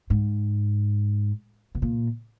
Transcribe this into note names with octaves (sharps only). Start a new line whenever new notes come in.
G#2
B2
A#2